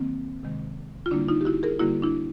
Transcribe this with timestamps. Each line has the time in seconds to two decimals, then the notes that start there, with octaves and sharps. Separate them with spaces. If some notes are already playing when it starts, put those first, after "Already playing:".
Already playing: D#3 F#3 A#3 C4
0.43 C3 D#3 G#3
1.06 F4
1.11 D3 G3 A#3 D4 E4
1.28 D#4 F4
1.41 G4
1.45 E4 F#4
1.63 G#4 A#4
1.80 D3 G3 A#3 E4 F#4
2.02 D4 E4